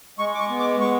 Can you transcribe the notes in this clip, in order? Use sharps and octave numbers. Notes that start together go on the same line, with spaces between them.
G#3 C#6
D6
C#6
B3
D6
G#3 C#6